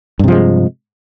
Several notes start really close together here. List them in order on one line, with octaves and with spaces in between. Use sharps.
G2 C3 F3 G#3